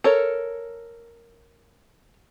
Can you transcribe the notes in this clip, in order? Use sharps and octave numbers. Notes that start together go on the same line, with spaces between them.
A4 A#4 C#5